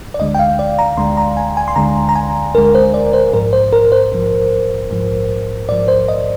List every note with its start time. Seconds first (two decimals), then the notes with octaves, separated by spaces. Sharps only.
0.14 D5
0.19 D2 D3 G#3 D#5
0.35 G5
0.39 F5
0.59 D5
0.79 A#5
0.97 D2 D3 G#3 C6
1.17 A#5
1.37 G#5
1.57 G#5
1.68 C6
1.76 D2 D3 G#3 A#5
2.09 A#5
2.15 G#5
2.54 D2 D3 G#3 A#4
2.75 C5
2.94 D5
3.13 C5
3.33 A#1 G#2 F3 A#4
3.53 C5
3.73 A#4
3.92 C5
4.12 A#1 G#2 F3
4.90 A#1 G#2 F3
5.69 A#1 G#2 F3 D5
5.88 C5
6.08 D#5